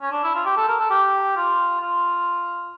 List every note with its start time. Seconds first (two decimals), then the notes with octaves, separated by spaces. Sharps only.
0.02 C#4
0.12 D4
0.24 E4
0.34 F4
0.45 G4
0.57 A4
0.68 A#4
0.79 A4
0.90 G4
1.36 F4
1.81 F4